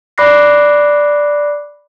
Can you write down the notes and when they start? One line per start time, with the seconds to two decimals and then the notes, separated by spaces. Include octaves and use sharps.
0.18 D5 B5 D6 F#6 A#6 C7